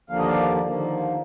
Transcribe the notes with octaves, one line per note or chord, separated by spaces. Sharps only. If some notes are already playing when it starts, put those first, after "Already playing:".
D#2 D3 F3 A#3 F5
D#5
D5 F5
D#2 D3 F3 A#3